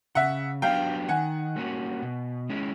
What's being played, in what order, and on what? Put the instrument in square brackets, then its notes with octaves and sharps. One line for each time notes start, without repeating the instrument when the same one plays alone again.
[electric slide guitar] C#3 [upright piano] E5 F#5
[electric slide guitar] F#3 B3 D4 G4 [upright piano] F5 G5
[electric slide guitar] D#3 [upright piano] F#5 G#5
[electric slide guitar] G3 A#3 C#4 F#4
B2
G#3 C#4 E4